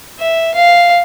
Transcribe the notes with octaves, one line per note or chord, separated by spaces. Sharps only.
E5
F5